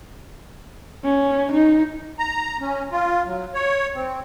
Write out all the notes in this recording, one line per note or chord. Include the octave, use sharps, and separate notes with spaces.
C#4
D#4
A#5
C#4
F4
F#3
C#5
C4